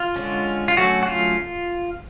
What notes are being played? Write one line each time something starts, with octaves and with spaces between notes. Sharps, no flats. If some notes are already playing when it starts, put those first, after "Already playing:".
Already playing: F4
D3 G#3 C#4
F4
D3 F#3 A3 C#4 F#4
F#4
F4